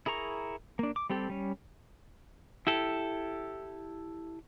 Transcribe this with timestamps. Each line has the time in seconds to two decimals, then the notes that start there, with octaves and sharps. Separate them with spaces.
0.06 E4 G#4 A#4 A#5 C#6
0.79 A#3 D4
0.96 D6
1.10 G3 C4 G4 A4
1.30 G3 C#4
2.67 E4 G4 A4